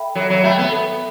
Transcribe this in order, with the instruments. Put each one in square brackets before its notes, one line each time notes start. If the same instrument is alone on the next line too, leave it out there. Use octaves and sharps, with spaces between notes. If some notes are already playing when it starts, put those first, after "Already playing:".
Already playing: [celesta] A4 E5 G5 B5
[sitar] F#3 [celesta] A4
[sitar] F#3
[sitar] A3 [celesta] E5 G5 B5
[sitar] B3
[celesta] A4